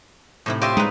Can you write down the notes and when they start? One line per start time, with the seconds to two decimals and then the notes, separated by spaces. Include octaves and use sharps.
0.46 A2 C3 D#4 E4
0.62 F4 G4 C#5 D#5 E5 C6
0.77 G#3 D#4 B4